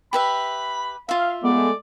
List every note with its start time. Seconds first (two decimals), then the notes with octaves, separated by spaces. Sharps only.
0.13 G4 B4 E5 B5
1.09 F4 E5 F5
1.44 G#3 A3 B3 D5